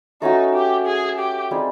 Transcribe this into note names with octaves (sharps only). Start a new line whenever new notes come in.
A3 C#4 D#4 F#4
G4
G#4
G4
G3 C4 D#4 G#4